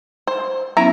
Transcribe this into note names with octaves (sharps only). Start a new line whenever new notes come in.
C5
F#3 B3 C#4 E4 A#5